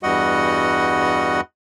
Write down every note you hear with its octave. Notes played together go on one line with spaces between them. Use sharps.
E2 G2 G3 F#4 D#5 F#5